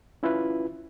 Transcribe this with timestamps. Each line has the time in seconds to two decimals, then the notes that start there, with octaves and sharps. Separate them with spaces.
0.23 C#4 E4 F4 B4